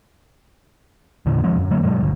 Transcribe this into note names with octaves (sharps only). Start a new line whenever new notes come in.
E2 A#2 D3 E3
E1 F3 G#3 C4
F#2
D3 F#3 A3 A#3
G2 B2 F#3 G#3
G1 D2